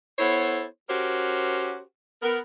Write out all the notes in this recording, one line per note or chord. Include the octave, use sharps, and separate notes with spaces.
B3 E4 A4 C5 C#5
C#4 F#4 G4 A#4 C5 C#5
B3 A#4